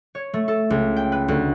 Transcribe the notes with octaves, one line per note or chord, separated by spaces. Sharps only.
C#5
A3
A4
C#2
G5
B4
D2